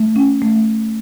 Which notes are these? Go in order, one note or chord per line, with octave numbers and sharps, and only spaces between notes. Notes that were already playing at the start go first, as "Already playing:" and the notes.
Already playing: A3
C#4
A3